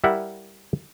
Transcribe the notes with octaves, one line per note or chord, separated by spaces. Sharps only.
G3 E4 A#4 E5 F#5